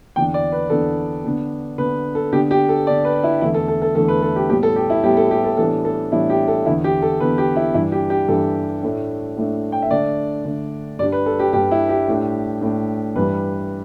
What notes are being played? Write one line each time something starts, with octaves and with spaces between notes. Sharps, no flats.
E2 D3 B3 D4 G5
D5
B4
E2 D3 B3 D4 A4
D3 B3 D4
D3 B3 D4 B4
A4
D3 B3 D4 G4
G4
A4
D3 B3 D4 D5
B4
E4
E2 D3 A3 E4
A4
A4
A4
E2 D3 A3 A4
B4
A4
G4
A2 G3 B3 G4
A4
G4
E4
A2 G3 B3 G4
A4
G4
A4
A2 E3 G3 B3 D4 A4
A4
A2 E3 G3 B3 D4 E4
G4
A4
E2 D3 B3 E4
G4
A4
E2 D3 B3 B4
G4
E4
G2 E3 G3 D4 E4
G4
G4
G2 E3 G3 D4 A4
A2 A3 D4
A2 A3 D4
G5
E5
D3 A3 D4 D5
D3 A3 D4
G2 G3 D4 D5
B4
A4
G4
G2 G3 D4 G4
E4
G4
A2 A3 D4
A2 A3 D4
G2 E3 G3 B4